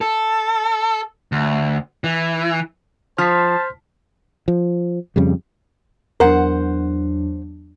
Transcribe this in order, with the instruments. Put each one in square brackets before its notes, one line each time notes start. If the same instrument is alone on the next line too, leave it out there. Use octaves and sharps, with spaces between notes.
[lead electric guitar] A4
D2
E3
[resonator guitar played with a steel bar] F3 [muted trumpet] C5 [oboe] A5 [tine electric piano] F6 B6
[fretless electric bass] F3
F2 C#3 G3
[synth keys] E2 F#3 D4 [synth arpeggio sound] A#4 [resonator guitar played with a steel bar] C5 F#5